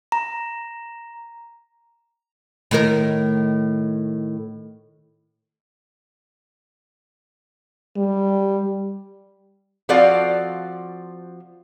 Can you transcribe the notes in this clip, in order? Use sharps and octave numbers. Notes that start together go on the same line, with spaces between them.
A#5
A2 D#3 A#4
G3
F3 C4 F#4 A4 D5 F5